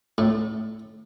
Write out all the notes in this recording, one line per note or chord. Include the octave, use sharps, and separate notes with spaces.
A2